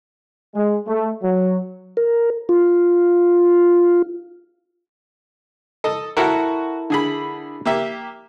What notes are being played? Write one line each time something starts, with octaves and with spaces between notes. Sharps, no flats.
G#3
A3
F#3
A#4
F4
A4 D#5
E4 F#4 A4 A#4 F#5
D3 G#4 B5
A#3 G4 E5